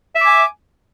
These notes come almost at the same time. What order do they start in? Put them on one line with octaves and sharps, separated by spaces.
E5 D6 G#5